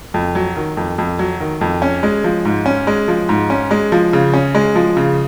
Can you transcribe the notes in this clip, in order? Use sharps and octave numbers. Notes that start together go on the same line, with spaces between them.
F2
F#3
D#3
F2
F2
F#3
D#3
F2
C#4
G#3
F3
G#2
C#4
G#3
F3
G#2
C#4
G#3
F3
C#3
C#4
G#3
F3
C#3